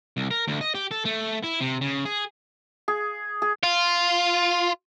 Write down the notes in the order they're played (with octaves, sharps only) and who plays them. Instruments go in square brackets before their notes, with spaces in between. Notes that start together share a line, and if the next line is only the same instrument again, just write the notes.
[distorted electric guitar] C2
A#4
D2
D#5
G4
A4
A3
E4
C3
C#3
G#4
[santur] G#4
G#4
[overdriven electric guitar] F4